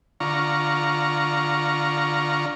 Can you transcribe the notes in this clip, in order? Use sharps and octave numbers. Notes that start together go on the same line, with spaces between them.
D3 F4 A#5 C#6